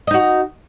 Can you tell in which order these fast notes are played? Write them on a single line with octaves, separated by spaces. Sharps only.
D#5 D#4 F#4